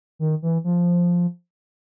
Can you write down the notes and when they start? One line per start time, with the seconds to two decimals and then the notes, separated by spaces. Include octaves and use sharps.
0.19 D#3
0.42 E3
0.64 F3